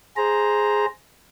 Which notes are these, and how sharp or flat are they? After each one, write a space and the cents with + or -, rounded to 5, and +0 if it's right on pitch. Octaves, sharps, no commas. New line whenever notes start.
G#4 +0 C5 +0 A#5 +0